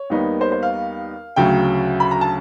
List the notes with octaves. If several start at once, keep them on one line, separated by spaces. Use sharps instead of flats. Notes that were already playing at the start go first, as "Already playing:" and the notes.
Already playing: C#5
D#2 D#3 G3 B3 D#4
C5
C5
F5
D2 C#3 F#3 G5
B5
A#5
A5